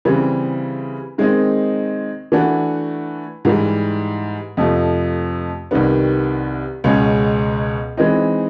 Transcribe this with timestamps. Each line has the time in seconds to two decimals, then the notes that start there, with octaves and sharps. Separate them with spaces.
0.05 C#3 E3 G3 C4
1.18 D#3 G#3 C4 D#4
2.32 E3 A3 D4 F#4
3.45 G#2 E3 G3
4.57 F2 C3 F3 A3
5.71 C2 C3 D#3 G3 B3
6.84 C#2 B2 G#3 C#4
7.97 E3 G#3 C4 D#4